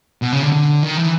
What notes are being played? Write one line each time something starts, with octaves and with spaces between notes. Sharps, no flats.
B2
C#3
D3
D3
D#3
E3